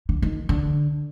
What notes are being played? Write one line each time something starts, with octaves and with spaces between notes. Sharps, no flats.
D3
D#3
D3